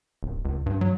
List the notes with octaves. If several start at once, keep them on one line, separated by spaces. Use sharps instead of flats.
D1
C#2
G2
F#3